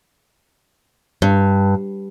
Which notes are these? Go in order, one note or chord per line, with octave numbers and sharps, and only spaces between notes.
G2